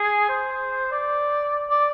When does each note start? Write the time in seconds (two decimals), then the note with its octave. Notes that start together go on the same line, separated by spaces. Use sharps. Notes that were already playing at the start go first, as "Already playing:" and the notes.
Already playing: G#4
0.29 C5
0.92 D5
1.70 D5